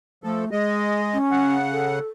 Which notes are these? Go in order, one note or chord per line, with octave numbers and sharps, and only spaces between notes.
F3 A3 A4
G#3 G#4 D#5
C#4
C#3 F#5
A4